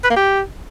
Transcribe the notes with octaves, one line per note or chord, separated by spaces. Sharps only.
B4
A#3
G4